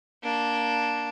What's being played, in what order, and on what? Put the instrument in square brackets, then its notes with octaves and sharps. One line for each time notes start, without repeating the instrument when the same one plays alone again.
[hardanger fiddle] A#3 D4